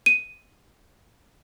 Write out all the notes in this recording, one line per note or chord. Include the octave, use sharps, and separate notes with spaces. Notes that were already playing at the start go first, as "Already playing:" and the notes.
D#7